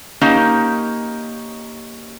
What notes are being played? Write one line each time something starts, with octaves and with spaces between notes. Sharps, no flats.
A#3 C#4 D#4 G4